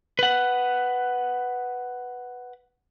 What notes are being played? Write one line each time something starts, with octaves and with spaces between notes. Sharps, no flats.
B4 F#5